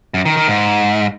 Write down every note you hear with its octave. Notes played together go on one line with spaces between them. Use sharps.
F#2
D#3
D#3
G#2